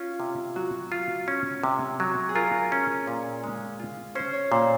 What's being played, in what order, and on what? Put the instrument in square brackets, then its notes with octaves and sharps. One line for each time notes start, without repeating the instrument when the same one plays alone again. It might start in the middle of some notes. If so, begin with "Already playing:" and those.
Already playing: [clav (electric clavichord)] C#4 [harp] F4
[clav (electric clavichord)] C3
[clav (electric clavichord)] F#3 [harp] F#4
[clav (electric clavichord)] F4
C#4
C3
F#3
[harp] G#4
[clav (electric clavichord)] F4 [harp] A#4
[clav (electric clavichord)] C#4
A#2
G#3
F4
[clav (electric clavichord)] C#4 [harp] C5
[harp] C#5
[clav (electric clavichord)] A#2 [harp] C5